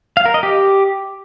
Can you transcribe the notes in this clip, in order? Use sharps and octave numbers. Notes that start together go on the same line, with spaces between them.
F5
A#4
D#5
G4